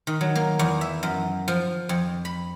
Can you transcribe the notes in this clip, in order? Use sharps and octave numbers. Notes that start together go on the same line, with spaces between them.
D#3
F#3
A#3
E2
E5
F#2
F3
F2
B5